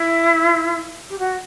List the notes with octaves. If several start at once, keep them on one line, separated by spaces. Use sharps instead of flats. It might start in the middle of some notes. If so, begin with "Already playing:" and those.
Already playing: E4
G4
F#4